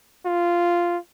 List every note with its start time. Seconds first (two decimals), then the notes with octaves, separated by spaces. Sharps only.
0.26 F4